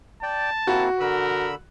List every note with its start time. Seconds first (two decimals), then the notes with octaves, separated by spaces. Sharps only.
0.23 D5 G5 A5
0.67 A#3 C4 E4 F#4
1.00 D3 A#4 B5 E6